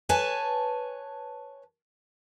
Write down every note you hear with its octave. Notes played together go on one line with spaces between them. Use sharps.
B4 C#5 G#5 A5